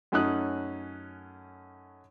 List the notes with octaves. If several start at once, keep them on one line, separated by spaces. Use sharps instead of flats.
F#2 A3 C#4 D#4 D#6 F#6